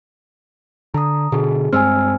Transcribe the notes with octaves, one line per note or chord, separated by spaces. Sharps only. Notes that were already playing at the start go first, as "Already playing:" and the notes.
D3 A#5 D#6
B2 D3 G#4
G2 G#3 C4 G#5 E6 F6